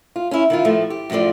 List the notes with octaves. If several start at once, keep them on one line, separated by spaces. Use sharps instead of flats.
F4
C#4 E4
D#3 E4 F4
A2 F3 A3
G4
F#2 A2 F3 F4 D5